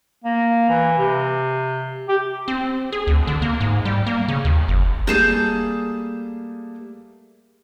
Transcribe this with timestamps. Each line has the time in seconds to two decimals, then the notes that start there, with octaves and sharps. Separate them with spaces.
0.24 A#3
0.69 E3
0.98 C3
2.08 G4
2.48 C4
2.92 G#4
3.07 D2
3.27 D3
3.42 A#3
3.61 G#2
3.85 G3
4.07 A#3
4.28 C#3
4.45 D#2
4.68 F#1
5.07 G3 A3 A#3 G#4 A5 G6